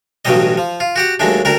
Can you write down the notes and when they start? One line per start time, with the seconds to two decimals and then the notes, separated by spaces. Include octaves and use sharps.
0.25 A1 G2 B2 F#3 G3 D#5
0.57 F3
0.80 F4
0.96 F#4 G4 F#5
1.20 D#2 F#3 G#3 A3 D4
1.45 D2 G3 D4 A#4